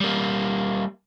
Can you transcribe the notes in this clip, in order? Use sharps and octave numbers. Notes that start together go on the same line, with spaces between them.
G3 A#3